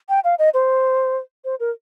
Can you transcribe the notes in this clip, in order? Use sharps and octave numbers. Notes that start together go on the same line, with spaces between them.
G5
F5
D#5
C5
C5
A#4